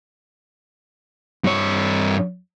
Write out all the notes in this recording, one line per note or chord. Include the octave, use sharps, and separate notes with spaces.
G2 C#5